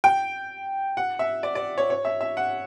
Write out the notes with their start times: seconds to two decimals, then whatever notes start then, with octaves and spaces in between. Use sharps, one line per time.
0.04 G5
0.97 F#5
1.19 E5
1.43 D5
1.55 D5
1.78 C#5
1.90 C#5
2.05 E5
2.21 E5
2.37 F#5